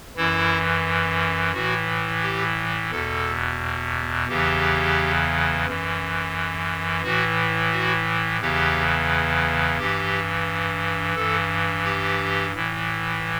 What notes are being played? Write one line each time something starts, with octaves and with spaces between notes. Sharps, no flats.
F#2 E3 E4
A2 E3 F#4
G4
E2 B2 A4
E2 C#3 E3 G4
F#2 E3
A2 E3 F#4
F#4
E2 C#3 E3 G4
G2 E3 G4
G2 E3 A4
G4
A2 E3